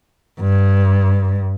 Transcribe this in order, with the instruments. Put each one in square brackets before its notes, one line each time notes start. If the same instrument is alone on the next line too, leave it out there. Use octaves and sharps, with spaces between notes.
[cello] G2